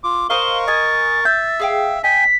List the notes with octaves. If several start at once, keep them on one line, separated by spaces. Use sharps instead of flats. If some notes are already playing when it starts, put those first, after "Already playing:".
F4 D6
A#4 C5 D#5 F5 C#6 G7
D#5 G#5 A6
E5 G6
G#4 F5 G5
D#5 G5 G#5 B6